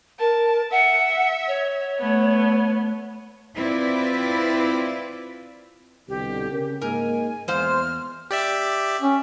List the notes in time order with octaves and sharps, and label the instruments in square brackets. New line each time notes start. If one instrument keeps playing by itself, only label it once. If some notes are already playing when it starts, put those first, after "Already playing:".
[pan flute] A#4 [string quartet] A5
[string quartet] E5 [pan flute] F#5
[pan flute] C#5
[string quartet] A3 B3
[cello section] C4 E4 F4 B4 D5
[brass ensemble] C2 B2 D3 [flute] G4
[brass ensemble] C#3 C#4 A#4
[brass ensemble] G#2 G#3 A#3 [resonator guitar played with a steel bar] A#4 [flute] G#5
[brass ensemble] E2 [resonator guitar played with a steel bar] G#3 C5 F5 [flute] F6
[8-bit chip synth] G4 D5 E5
[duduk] C#4